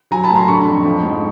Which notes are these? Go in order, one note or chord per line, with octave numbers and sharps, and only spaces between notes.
F#3 G#5 A#5
A5 B5
A2
A#5 C6
D3 B5 C#6
F2
F3
G#2